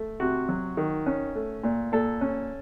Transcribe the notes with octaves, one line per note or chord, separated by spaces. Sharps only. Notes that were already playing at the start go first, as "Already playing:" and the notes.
Already playing: A3
C3 F#4
F#3
D#3
C#4
A3
A#2
A#2 A4
C#4